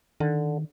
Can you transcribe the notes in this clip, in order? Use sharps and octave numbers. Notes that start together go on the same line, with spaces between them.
D3 D#3